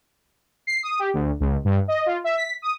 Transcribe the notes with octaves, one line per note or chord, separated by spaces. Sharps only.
C7
D#6
G4
D2
C#2
G2
D#5
F4
E5
B6
D#6